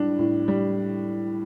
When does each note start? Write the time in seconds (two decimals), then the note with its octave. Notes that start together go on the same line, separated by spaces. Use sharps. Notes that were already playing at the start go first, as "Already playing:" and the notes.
Already playing: A2 G3 D4
0.19 A2
0.48 G3